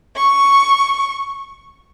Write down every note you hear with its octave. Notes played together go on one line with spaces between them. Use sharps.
C#6